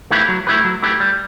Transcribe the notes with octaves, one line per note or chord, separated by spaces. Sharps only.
A3 E4 G4 B4
F#3
A3 E4 G4 B4
F#3
A3 E4 G4 B4
G3